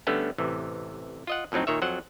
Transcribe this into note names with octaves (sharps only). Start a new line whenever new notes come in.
D3 G3 A3 B3 C#4
A1 C3 E3
F4 D#5 F#5
F2 A2 F#3 C4 D#4
A#2 D#3 C#5 E5
F2 F#3 C5 F#5